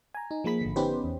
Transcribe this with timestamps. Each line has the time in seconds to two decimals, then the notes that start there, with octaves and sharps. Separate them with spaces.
0.15 G#5 A#5
0.31 D#4
0.44 F3 A#3 G#4 B5 B6
0.61 G#1 D3
0.76 B3 C#4 D#4 G4 B4 C5
1.04 E2